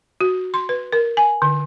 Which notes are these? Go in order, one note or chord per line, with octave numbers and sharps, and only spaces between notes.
F#4
C6
B4
A#4
G#5
D3